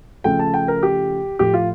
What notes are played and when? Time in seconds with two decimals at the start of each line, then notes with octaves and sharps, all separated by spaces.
0.24 C#3 F3 A3 G5
0.39 A5
0.54 G5
0.68 A#4
0.83 G4
1.39 A2 F3 A3 G4
1.54 F4